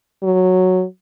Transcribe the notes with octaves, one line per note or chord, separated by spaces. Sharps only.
F#3